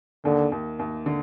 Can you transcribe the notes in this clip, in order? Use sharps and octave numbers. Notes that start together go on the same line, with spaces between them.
D#2 D3
D#2
D#2
D3